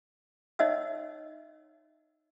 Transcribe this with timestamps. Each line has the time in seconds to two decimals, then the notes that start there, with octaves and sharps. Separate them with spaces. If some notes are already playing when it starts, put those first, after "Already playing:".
0.59 D#4 C#5 D#5 E5 F#5 E6